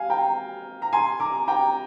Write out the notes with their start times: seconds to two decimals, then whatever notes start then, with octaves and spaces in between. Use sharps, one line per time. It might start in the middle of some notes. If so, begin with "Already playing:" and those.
Already playing: F5 G#5
0.09 G5 A#5
0.82 A#5
0.93 G#5 C6
1.20 A#5 D6
1.48 G5 A#5